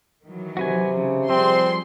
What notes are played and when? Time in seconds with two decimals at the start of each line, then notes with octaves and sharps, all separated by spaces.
0.24 D#3 E3 F#3
0.57 C3 F#4 B4 G#5
0.93 C#3
1.29 F3 G3 C4 G#4 C6